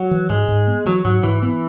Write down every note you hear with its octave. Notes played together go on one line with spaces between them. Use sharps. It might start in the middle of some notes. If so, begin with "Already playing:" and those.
Already playing: F#3
E3
G#2 G#3
G#2
B3
E3 F#3
G#2 F#3
G#2 E3
E3 B3